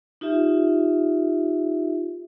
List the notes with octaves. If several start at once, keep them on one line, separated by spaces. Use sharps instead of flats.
D#4 F4 G4 E5